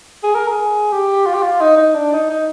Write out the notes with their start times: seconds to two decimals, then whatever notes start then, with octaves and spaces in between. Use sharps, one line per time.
0.23 G#4
0.35 A#4
0.48 G#4
0.92 G4
1.26 F4
1.34 G4
1.43 F4
1.61 D#4
1.77 D#4
1.95 D4
2.13 D#4
2.29 D#4